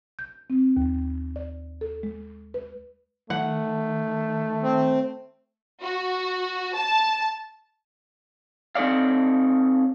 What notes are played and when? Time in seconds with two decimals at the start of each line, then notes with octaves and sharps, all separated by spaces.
0.19 G6
0.50 C4
0.77 D#2
1.36 D5
1.81 A4
2.03 G#3
2.54 B4
3.30 D#3 A3 F#5
4.63 C4
5.82 F#4
6.75 A5
8.75 C4 D#4 A4 C#5 D5 F5